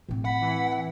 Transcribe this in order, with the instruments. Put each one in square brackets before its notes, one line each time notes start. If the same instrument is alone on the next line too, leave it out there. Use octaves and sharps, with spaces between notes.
[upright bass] A2 C4
[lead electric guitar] F#5 [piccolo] B5
[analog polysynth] E3